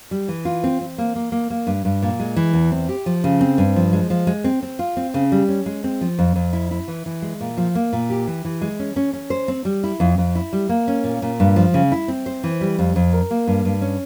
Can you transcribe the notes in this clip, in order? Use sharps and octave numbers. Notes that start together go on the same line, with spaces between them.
G3
E3
F4
C4
C4
A#3
A#3
A#3
A#3
G2
G2
A#2
G#3
E3
E2
C4
G4
F3
C#3
C4
G2
F3
G#3
F3
G#3
C4
C4
F4
C4
C#3
G3
C#4
G#3
C4
F3
F2
F2
E4
E4
E3
E3
G#3
A#2
F3
A#3
A#2
G4
E3
E3
G#3
C#4
C#4
C#4
C5
C4
G3
E4
F2
F2
E4
G3
A#3
C#4
A#2
A#2
G2
F3
C#3
E4
C4
C5
E3
G3
F2
F2
A#4
A#3
G2
G2
C#4